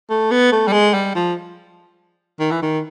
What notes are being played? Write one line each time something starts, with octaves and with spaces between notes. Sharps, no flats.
A3
B3
A3
G3
G#3
G3
F3
D#3
E3
D#3